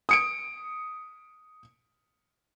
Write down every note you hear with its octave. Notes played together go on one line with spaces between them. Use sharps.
D#6 C#7 D7